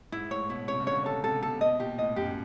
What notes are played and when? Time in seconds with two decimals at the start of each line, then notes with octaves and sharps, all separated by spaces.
0.12 G#2 E4
0.31 A2 C#5
0.49 B2 E4
0.68 C3 C#5
0.80 C#3
0.86 D3 C#5
1.06 A4
1.24 C3 A4
1.43 B2 A4
1.61 B2 D#5
1.80 A#2 G4
1.98 A2 D#5
2.16 F#2 G4